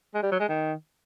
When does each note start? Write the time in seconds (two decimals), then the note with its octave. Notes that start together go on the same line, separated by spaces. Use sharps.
0.14 G#3
0.23 G3
0.32 F#3
0.40 G#3
0.49 D#3